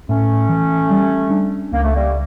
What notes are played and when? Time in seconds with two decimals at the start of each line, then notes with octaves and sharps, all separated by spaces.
0.08 A2 A3 C#4
0.49 E3
0.90 G3
1.30 D4
1.72 C#2 A#3
1.83 A3
1.94 G3 A#3